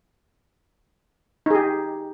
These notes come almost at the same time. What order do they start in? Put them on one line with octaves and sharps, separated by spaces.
D#4 G#4 G4